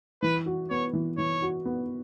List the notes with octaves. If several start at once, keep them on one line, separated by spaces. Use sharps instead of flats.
E3 B4
F#4
B3 C#5
E3
E3 C#5
F#4
B3